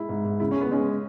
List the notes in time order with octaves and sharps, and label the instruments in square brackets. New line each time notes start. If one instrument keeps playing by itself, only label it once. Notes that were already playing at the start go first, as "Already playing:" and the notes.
Already playing: [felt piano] G#3 E4
G#2
G#2
[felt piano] C#3 [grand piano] E4
[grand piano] C#4
[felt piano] G#3
[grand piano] B3
[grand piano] G#3 [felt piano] C#4